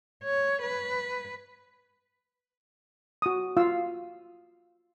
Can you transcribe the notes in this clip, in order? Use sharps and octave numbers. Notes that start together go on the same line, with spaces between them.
C#5
B4
F#4 D#6
F4 F5 E6